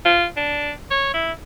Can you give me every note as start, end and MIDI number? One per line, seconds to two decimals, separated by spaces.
0.05 0.25 65
0.37 0.71 62
0.91 1.11 73
1.14 1.32 64